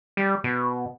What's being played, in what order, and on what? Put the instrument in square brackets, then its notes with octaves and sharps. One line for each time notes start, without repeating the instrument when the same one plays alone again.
[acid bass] G3
B2